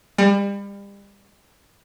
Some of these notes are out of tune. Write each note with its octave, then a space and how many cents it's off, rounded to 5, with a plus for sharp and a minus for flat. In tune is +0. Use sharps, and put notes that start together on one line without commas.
G3 +35